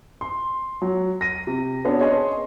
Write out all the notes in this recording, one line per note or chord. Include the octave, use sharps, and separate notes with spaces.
C6
F#3
A#6 D#7
C3
B3 C#4 D4 F#4 G#4 A4
G#4 C#5 D#5 G#5 C6